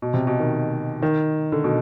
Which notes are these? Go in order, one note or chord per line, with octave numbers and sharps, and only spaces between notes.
B2
C3
B2
D#3
D#3
D3
B2